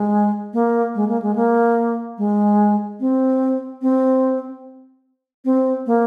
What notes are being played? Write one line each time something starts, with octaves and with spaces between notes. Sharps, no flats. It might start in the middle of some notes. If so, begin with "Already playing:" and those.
Already playing: G#3
A#3
G#3
A#3
G#3
A#3
G#3
C4
C4
C4
A#3